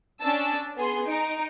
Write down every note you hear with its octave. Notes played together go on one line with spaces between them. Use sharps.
C#4 D4 A5 E6
B3 G#4 C6
D#4 D7